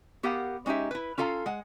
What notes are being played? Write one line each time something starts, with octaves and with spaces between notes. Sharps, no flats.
B3 G4 A#4 F5 F#5
G#3 C#4 D#4 G4 E5
E4 B4
C#4 F4 A4 F5 A#5
G#3 F#5